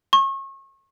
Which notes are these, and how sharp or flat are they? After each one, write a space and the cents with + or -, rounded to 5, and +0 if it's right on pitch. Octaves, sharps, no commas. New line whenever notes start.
C#6 -35